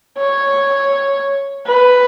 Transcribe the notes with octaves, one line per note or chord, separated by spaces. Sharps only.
C#5
B4